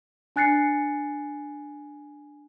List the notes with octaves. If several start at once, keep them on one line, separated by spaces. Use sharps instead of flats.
D4 G#5 F#6 A6 C7 C#7